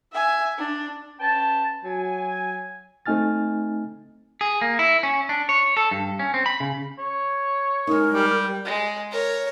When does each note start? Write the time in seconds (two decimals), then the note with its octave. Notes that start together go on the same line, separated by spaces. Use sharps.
0.12 E5 G#5
0.58 D4
1.19 C#4 B4 G5 A5
1.84 F#3 G#5
3.06 A3 C4 D#4 G#5 F6 A6
4.41 G#4
4.61 A#3
4.79 E4
5.03 C#4
5.29 D4
5.49 C#5
5.77 A4
5.91 G2
6.19 C#4
6.34 C4
6.46 B5
6.60 C#3
6.99 C#5
7.87 G#3 D#4 A#4
8.14 G3 D5
8.65 G#3
9.11 A#4 C#5